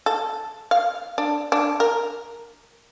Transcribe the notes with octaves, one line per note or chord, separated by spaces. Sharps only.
A4
F5
D4
D4
A#4